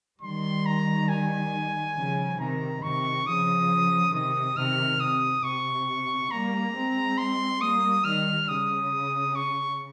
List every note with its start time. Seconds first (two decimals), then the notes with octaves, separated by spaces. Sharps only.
0.22 D#3 G3 C6
0.66 A#5
1.09 G#5
1.95 C#3 F3
2.39 C3 D#3 A#5
2.83 C3 D#3 C#6
3.26 C#3 F3 D#6
4.13 C3 D#3 D#6
4.57 C3 D#3 F6
5.00 C3 D#6
5.44 C3 C#6
6.31 G3 A#3 A#5
6.75 G#3 C4
7.18 C6
7.61 G3 A#3 D#6
8.04 D#3 G3 F6
8.48 C#3 D#6
9.36 C#6